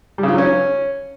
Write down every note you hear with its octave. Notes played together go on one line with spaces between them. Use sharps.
G3
C#3
F4
F#3
C#4